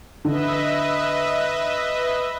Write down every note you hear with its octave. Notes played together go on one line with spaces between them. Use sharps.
D3 B4 D#5 E5